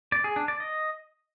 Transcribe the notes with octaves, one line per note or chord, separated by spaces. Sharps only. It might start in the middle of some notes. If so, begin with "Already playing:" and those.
D5
G#4
D4
D5
D#5